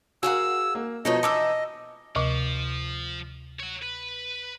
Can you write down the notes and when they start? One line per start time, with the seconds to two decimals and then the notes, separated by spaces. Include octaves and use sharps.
0.23 F#4 G#4 A#4 F5 F#5 E6
0.75 A#3
1.05 B2 F3 A3 D#4 C#5 D#5
1.23 E3 D#4 E4 A5 D6 E6
2.16 D2 C3 F3 D6
3.60 C#5 F#5
3.83 B4